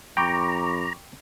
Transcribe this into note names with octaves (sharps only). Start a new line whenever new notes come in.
F2 G5 A#5 B5 C#6 D6